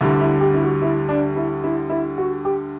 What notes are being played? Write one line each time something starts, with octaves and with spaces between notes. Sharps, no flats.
D2 D3 G3 E4
E4
G4
E4
F#4
E4
D4
E4
E4
E4
F#4
G4